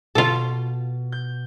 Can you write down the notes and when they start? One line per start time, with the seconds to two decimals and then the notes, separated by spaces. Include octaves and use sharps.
0.15 B2 F4 A4
1.12 G6